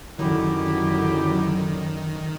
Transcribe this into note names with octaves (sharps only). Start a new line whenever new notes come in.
F#2 D3 D#3 F#3 E4 G4